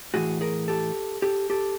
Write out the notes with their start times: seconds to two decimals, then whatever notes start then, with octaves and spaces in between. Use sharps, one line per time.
0.14 A2 E3 F#4 G#4
0.41 G#4 A#4
0.68 G4 A4
1.22 G4 A4
1.50 G4 A4